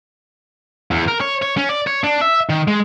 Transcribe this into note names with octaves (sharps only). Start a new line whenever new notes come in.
E2
A#4
C#5
C#5
C#4
D5
C#5
D4
E5
D#3
G#3